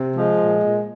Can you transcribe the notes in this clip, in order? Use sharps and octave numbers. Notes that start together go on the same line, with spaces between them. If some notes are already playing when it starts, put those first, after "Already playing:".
Already playing: C3
F3 G#3
A#2
A#2